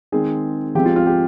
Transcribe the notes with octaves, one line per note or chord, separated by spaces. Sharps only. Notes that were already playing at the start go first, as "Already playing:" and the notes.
D#3 G#3 C4 G#4
F3 G#3 C4 G4
F4
F4
G4